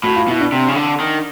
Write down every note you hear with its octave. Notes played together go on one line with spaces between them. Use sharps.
A2 F#4
F4
B2 E4
D4
C3
C#3
D3
D#3